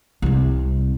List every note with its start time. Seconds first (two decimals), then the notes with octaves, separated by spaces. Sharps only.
0.22 C2 C3